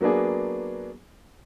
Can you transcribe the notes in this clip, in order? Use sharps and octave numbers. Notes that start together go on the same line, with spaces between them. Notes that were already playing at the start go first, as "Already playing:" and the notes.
F#3 A#3 B3 D4 G#4